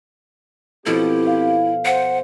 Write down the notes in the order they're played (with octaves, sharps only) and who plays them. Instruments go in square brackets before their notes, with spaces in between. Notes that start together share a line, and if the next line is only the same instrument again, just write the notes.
[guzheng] B2 F3 A4 [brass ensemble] C4 G4 [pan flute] E4
[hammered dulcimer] F5
[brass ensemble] C5 [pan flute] F#5